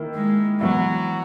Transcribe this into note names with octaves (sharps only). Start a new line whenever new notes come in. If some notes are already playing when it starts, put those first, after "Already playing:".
Already playing: D#3 A#3 E4
G#3
E3 F#3 B3 E4